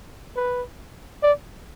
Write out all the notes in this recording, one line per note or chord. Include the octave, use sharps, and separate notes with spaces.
B4
D5